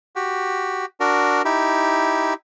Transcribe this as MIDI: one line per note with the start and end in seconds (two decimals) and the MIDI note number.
0.16 0.86 66
0.16 0.86 67
1.00 1.42 62
1.00 1.42 66
1.00 1.42 70
1.45 2.34 63
1.45 2.34 64
1.45 2.34 67